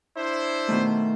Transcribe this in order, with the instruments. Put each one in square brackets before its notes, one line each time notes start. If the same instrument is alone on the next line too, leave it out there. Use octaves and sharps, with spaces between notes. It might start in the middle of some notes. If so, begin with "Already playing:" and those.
[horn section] D4 E4 C5
[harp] B2 D#3 A3